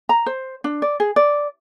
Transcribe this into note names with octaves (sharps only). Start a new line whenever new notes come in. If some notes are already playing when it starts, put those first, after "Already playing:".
A#5
C5
D4
D5
G#4
D5